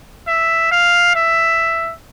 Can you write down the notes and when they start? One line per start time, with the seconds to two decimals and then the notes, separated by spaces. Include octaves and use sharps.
0.27 E5
0.71 F5
1.15 E5